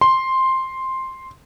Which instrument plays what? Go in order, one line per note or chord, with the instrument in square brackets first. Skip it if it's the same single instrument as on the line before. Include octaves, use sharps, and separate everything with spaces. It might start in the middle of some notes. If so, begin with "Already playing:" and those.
[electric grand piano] C6